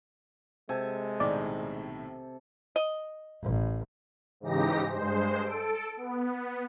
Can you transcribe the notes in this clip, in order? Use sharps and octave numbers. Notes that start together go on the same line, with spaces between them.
C3 G#3 A4 G#5
B1 A2 D#3 D5
D#5
A1
G#2 C#3 E3 D#4 G4 A#6
G2 G#3 C5
A4 D7
B3